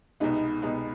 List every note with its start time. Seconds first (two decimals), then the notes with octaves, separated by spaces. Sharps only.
0.20 C2 B2 G#3 B3 D#4
0.62 C2 B2 G#3 B3